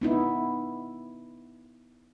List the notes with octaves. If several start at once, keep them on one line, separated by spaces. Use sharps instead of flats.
B3 D#4 E4